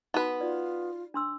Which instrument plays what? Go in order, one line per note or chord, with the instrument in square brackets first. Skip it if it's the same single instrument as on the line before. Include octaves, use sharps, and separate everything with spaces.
[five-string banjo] B3 B4 [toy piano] D#4 F#4 B5
[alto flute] F4 [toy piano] D5
[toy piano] D4 C6 E6